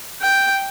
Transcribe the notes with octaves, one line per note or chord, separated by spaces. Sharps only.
G5